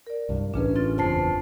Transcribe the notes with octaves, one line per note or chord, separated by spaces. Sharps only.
A#4 D5
C2 G2
A1 C#4 D4 G#4 B4
C4 F4 A6
F#1 E2 F4 C5 A5 C7